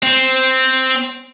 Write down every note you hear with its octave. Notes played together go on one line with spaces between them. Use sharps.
C4